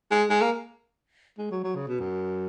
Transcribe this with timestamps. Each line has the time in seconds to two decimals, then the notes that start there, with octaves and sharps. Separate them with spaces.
0.11 G#3
0.30 G#3
0.41 A#3
1.39 G#3
1.51 F#3
1.64 F#3
1.75 C#3
1.88 B2
2.00 F#2